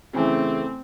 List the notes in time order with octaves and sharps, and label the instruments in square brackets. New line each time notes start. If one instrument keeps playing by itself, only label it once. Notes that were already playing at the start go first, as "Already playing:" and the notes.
[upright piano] C#3 E3 A3 [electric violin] C4